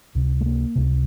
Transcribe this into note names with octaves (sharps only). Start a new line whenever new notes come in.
C#2 C3
A3
A#3
C#2 C3